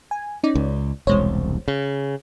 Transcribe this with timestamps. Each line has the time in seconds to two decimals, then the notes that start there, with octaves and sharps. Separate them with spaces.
0.11 G#5
0.43 C#4 D#4 D5
0.55 C#2
1.07 E1 C2 G#3 C5 C#5
1.68 C#3